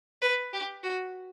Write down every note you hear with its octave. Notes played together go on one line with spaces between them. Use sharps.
B4
G4
F#4